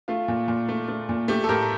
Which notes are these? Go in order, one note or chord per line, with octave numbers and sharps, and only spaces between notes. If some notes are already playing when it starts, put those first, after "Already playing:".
A3 F4
A#2
A#2
A3
A3
A#2
A3 G4
A4
A2 G4 A#4